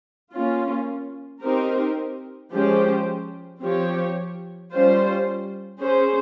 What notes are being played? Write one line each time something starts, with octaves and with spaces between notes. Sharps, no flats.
A#3 C#4 F4
C4 D#4 G4 A#4
F3 G#3 C#4 G4 C5
F3 C4 G4 C#5
G3 C#4 F4 C5
C#4 G#4 C5